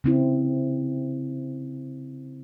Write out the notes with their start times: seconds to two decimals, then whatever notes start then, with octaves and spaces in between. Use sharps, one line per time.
0.04 C#3 C4 E4